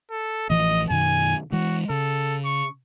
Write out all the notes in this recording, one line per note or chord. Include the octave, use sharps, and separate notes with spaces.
A4
A1 E3 F3 D#5
F#2 B2 D#3 G#5
E3 G#3 F#4
C#3 A4
C#6